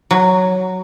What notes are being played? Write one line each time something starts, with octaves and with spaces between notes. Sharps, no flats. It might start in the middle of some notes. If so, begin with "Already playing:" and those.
F#3